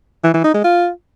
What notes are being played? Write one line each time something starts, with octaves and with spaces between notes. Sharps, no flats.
E3
E3
D#4
G#3
F4